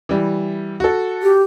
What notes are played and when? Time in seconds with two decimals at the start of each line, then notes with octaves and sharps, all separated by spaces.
0.09 E3 G3
0.80 F#4 A4
1.23 G4